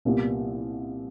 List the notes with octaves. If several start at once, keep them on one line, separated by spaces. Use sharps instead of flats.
C2 A#2 G3 B3